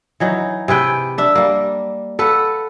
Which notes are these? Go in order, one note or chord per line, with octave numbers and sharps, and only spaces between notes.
E3 F#3 D#4
C3 G#4 B4 G5
D4 E5
G3 A#3
A4 B4 F5 F#5